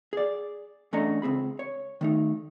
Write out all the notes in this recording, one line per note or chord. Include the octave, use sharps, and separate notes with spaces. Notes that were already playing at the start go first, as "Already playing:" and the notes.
G#4 D5
E2 A3 C#4 D4 D#5 A#5
C#2 C4 G#4 B5
C#5
D#3 A3 D#4